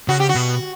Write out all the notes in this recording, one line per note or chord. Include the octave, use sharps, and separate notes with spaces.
C#3 F#4
G4
F#4
B2